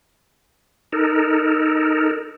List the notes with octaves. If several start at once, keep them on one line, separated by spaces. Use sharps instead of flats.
D#4 A4 A#4